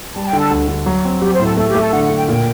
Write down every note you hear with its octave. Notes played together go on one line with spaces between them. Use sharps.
G3 A5
G5
D3
A4
D2
D3
F#3
C4
F#3 G4
C5
A2
A4
A3 A4
G4
A3
A4
D3 F#5
F#5
D3
G5
A#2 G5